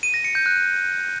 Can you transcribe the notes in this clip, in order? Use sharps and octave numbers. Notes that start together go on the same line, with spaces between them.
D#7
A#6
C#7
G6
F#6